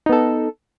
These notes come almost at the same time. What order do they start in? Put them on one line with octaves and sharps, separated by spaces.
D#4 B3 A4